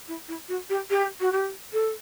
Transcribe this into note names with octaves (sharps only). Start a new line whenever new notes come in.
E4
E4
F#4
G4
G4
F#4
G4
A4